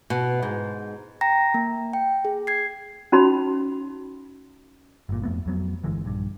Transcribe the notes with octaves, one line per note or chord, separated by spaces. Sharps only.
B2
G#2
G5 A#5 A#6
A#3
G5
G#4
G#6 C7
C#4 D#4 F#4 B5
G1 A#2
F2 A3 B3
F2 F#3 B3
G1 D3 E3 G#3
A#1 G2